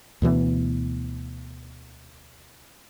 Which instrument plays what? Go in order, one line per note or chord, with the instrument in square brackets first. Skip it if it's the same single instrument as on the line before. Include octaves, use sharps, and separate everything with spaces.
[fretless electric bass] D2 B2 E3 B3